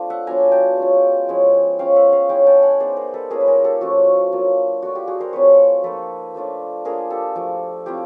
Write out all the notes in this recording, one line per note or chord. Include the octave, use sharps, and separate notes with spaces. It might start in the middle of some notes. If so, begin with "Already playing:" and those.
Already playing: A3 C4 D4 F4 C5
E5 F#5
F#3 B3 D4 F4 G#5 A#5
G5 A5
G#3 C#4 F4
F3 G#3 C#4 E4
G#3 C#4 F4 F5 G5
E5 F#5
D#5 F5
G#3 C#4 E4 F5 G5
G5 A5
F#5 G#5
G#3 B3 D#4 C5 D5
A#4 C5
A4 B4
A#3 C#4 F4 G#4 A#4
B4
G#4 A#4
G4 A4
F3 A3 C#4 F4 F#4
F#3 A#3 D4 F4
A3 D4 F4 F#4
F4 G4
F#4 G#4
A#4 C5
F#3 A3 C4 F4 B4 C#5
F3 A#3 D#4 A4 B4
F3 A3 D4 F4
A#3 D4 F4 G#4 A#4
G4 A4
F3 A3 D4
A3 C4 E4 F4 G4